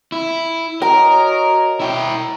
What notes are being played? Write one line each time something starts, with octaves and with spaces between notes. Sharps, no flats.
E4
F#4 A#4 C#5 D#5 A#5
E4 G5